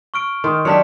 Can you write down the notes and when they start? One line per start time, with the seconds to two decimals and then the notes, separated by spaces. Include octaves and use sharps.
0.14 C#6 F6 D7
0.44 D#3 C6
0.65 F#3 D4 G4 B6 C#7